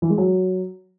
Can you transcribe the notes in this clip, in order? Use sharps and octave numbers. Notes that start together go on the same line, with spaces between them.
E3
G#3
F#3